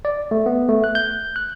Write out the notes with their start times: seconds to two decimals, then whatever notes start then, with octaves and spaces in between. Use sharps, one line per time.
0.05 D5
0.31 A3
0.46 B3
0.68 A3
0.84 F#6
0.95 G6
1.36 F#6